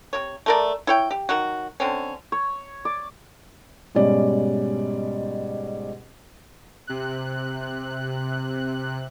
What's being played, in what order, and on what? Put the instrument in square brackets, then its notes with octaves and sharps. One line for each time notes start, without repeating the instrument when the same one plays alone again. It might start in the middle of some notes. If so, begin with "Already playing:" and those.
[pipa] C3 C#5
A3 A#4 D5
E4 C#5 G5
G4
D#3 F#3 F#4
D3 C4 C#4
[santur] C#5
D5
[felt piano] G#2 B2 G3 C#4 D5
[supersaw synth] C3 F#6